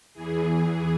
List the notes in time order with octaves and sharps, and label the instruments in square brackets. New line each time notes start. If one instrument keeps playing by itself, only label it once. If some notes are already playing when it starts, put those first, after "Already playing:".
[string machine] E2 E3 G#4